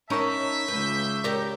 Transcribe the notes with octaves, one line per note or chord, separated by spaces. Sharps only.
C#4 D#4 A#4 E5 A5 B5 C#6 E6
C#2 B4 G6
G4 A#4 C#5 D5